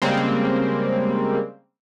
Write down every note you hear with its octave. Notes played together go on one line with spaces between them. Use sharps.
C#3 G3 G#3 A#3 C4